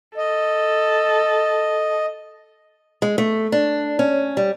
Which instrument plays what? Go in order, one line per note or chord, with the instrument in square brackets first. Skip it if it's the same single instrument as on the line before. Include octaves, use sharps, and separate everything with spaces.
[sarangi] A4 [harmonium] D#5
[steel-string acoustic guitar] G#3
A3
D4
C#4
G3